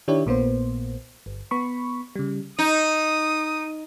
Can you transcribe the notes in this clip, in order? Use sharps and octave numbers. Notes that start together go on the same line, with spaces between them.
D#3 D4 E4 G4 C#5
A#1 A#2 A#3 B3 C5
G1
B3 B5 C#6
C#3 G3
D#4 D#6